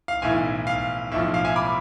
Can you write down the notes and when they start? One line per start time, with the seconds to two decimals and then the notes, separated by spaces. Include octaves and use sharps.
0.08 F5
0.22 B1 A2 E3 E5 G#5
0.67 F5
1.12 B1 A2 F3 E5
1.34 F5
1.45 E5 G#5
1.56 B5 D6